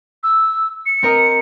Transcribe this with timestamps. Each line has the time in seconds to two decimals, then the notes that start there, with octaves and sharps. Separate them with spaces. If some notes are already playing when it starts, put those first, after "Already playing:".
0.23 E6
0.86 C#7
1.03 C4 A#4 D#5